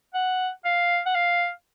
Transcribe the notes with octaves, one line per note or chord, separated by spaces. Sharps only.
F#5
F5
F#5
F5